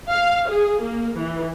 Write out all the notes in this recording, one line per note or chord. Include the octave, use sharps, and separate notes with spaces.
F5
G#4
A#3
E3